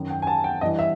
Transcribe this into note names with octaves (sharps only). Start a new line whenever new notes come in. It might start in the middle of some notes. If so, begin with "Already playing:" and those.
Already playing: F#2 D#3
G5
G#5
A5
G5
G2 E3 D#5
E5